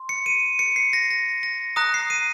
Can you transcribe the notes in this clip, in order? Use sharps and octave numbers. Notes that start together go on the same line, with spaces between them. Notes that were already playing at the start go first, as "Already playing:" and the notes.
Already playing: C6
C#7
D#7
C#7
C7
A#6
A#6
A#6
A#5 D#6 F#6 A#6
C7
D#7